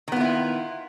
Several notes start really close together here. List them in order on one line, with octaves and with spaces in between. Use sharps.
D#3 B3 F4 E4